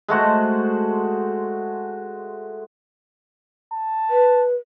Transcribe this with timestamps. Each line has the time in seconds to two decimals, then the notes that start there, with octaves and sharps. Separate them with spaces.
0.08 G#3 A3 F#4 C5
3.73 A5
4.10 B4